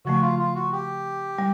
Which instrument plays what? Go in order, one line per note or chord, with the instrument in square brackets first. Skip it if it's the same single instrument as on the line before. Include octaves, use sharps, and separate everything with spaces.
[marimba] C#3 F3 A3 [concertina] F#4
[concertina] F4
F4
F#4
G4
[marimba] G3